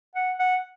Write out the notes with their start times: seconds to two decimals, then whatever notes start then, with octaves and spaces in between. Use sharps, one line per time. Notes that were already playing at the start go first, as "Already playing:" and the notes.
0.15 F#5
0.39 F#5